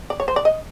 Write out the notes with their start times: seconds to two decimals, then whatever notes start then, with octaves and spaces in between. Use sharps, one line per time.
0.10 D5
0.20 C#5
0.28 C5
0.36 D5
0.45 D#5